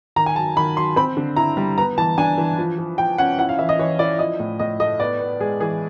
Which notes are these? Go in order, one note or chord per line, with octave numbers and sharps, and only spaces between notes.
D#3 A#5
G#5
F#3 A5
D#3 B5
F#3 C6
C4 B5
D3
E4 A#5
G3
B3 A#5
E3 A5
D4 G#5
E3
F3
F3
F3 G5
C#4 F#5
E4 F#5
F5
E3 E5
D#5
E3 C#5
E4 D5
F3 D#5
A2
A2 D#5
A3 D#5
B3 D5
B3
G#3 G#4
E3 G#4